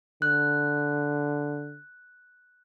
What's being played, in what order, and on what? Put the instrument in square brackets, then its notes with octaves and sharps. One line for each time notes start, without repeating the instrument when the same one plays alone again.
[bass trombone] D3 [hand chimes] F#6